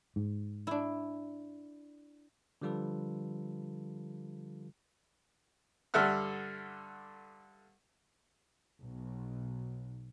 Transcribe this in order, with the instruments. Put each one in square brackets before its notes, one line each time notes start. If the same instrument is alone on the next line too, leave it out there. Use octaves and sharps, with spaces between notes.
[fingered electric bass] G#2
[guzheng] D4 E4
[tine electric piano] D3 F3 G3 F4 A4 B4
[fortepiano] G2 D3 A4 E5 F#5 F6
[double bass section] B1